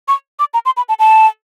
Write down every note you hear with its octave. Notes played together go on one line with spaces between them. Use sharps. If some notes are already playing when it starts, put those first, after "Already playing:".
C#6
D6
A#5
C6
B5
A5
A5